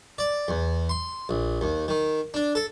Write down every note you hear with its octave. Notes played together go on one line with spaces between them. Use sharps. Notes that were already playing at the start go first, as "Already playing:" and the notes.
D5
E2
C6
A#1
D#2
D#3
D4
A4